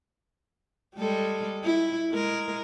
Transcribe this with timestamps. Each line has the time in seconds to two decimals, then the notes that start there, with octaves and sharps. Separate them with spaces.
0.96 G3 G#3 A4
1.64 E4
2.12 G#3 A#4